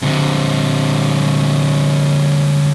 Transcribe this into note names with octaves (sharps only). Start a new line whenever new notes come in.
D3 C4